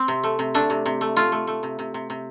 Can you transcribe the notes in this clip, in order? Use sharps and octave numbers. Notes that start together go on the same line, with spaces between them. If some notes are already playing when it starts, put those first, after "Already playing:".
Already playing: C4
C3
A3
C3
A3 D4
C3
C3
A3
A3 F4
A3
A3
C3
C3
C3
C3